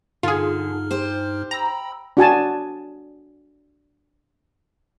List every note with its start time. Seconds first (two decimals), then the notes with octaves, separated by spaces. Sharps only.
0.23 G2 D3 D#4 F4 G#4 F6
0.91 G4 C5
1.51 G5 A#5 B5 E6
2.17 D4 F#4 G#5 A5